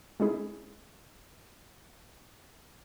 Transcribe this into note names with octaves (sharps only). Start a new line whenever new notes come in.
G#3 C4 C#4 D#4 E4 G#4